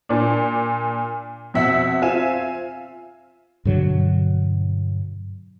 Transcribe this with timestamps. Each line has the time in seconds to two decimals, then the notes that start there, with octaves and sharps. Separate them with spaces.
0.09 A#2 D4
1.54 F2 B2 E5 F#5
2.02 C4 F4 E5 G#5 E7
3.65 G2 B2 D3 F#3